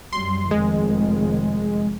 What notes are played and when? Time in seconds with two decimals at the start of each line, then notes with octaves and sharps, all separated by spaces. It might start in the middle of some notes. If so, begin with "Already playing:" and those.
0.13 F#2 G3 C6
0.51 F1 F2 D#3 G#3